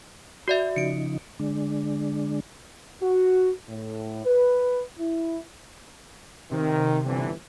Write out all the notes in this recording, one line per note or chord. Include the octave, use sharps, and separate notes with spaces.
F#4 D5 E5
C#3 F3 D#4 C#7 D7
D3 G#3 D4
F#4
A2
B4
E4
C3 D#3
G1 D3 E3